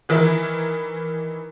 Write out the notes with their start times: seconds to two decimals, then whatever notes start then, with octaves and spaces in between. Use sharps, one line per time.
0.09 D#3 E3 E4 A#4